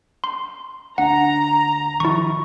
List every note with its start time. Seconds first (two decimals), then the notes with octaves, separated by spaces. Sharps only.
0.24 C6
0.98 D2 D4 F#5 A#5
2.00 D#3 F3 E4 C#6